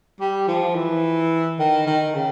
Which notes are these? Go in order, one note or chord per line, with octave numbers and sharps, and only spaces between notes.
G3
F3
E3
D#3
D#3
C#3